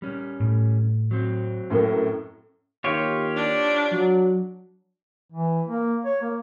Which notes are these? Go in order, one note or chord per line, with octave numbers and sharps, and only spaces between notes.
G3 C#4
A2
F#3 C4
F#2 A2 A#3
D#2 F4 G4 C#5
D4
F#3
E3
A#3
C#5
A#3